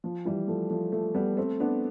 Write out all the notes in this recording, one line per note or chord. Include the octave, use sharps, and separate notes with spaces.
F3
E3 G3
F3 A3
F3 A3
F3 A3
G3 B3
A3 C4
B3 D4